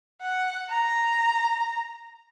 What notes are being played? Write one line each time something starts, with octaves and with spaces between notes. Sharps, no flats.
F#5
A#5